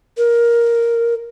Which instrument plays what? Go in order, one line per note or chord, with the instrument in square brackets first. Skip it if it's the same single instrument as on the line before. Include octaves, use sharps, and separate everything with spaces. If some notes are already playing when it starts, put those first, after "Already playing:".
[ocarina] A#4